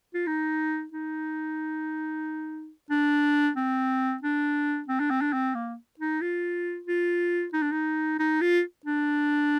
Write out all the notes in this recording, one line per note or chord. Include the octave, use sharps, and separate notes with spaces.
F4
D#4
D#4
D4
C4
D4
C4
D4
C4
D4
C4
A#3
D#4
F4
F4
D#4
D4
D#4
D#4
F4
D4